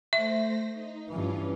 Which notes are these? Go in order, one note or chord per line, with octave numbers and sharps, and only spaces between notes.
A3 C5 E5 A#6
D#4
G2 E3 C#4 F4